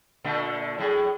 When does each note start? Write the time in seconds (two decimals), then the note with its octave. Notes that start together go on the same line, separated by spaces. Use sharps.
0.24 A#2 D3 A3
0.78 A2 F#3 G#4